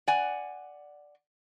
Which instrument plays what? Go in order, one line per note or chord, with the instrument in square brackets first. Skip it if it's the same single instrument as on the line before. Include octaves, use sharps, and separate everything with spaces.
[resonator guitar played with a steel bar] D5 F#5 G#5